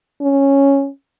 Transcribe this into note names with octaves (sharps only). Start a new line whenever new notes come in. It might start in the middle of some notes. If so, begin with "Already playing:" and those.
C#4